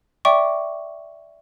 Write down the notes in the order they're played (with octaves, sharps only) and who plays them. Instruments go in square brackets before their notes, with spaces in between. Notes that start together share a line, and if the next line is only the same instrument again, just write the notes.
[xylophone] D5 E5 G5 C#6 D6